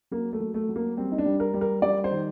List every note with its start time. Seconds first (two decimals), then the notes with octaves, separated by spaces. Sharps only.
0.11 F#3 A#3
0.33 A3
0.40 F#3
0.54 A3
0.69 F#3
0.76 A#3
0.97 G3 C4
1.12 D#4
1.18 D4
1.25 G3
1.40 A#4
1.54 G3
1.61 A#4
1.82 G3 D5
2.04 C5
2.11 D#3